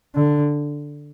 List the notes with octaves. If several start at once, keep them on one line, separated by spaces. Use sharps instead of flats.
D3